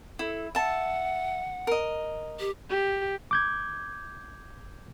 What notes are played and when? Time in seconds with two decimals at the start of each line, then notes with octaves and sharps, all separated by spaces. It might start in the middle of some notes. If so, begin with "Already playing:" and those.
0.19 E4 A4
0.55 E5 F#5 A5
1.67 A#4 D#5
2.39 G4
2.70 G4
3.31 D6 G6 G#6